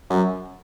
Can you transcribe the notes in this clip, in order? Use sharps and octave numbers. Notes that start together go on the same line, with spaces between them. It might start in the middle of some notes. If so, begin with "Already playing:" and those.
F#2